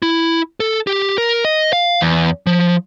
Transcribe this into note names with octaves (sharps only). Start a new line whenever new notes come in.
E4
A4
G4
A#4
D#5
F5
E2
F3